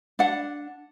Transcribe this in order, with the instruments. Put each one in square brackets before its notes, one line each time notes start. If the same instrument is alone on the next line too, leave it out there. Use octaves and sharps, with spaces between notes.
[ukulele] D4 F#5